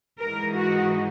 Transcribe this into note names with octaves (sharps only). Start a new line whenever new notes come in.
G#2 E3 G#3 D#4 A#4
F#4